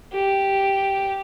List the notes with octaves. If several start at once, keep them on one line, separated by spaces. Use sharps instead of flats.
G4